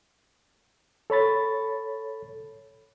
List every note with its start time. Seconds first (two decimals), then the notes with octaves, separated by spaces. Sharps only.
1.10 A4 C#5 B5 A6